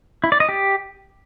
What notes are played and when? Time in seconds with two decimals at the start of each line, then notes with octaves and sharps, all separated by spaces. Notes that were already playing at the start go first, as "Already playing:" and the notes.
0.24 E4
0.32 D5
0.40 D#5
0.49 G4